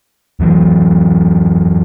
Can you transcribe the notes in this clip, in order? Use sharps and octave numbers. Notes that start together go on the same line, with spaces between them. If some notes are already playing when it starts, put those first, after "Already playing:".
F2 E3 F#3